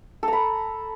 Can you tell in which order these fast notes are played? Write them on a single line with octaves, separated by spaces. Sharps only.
A4 A#5 B5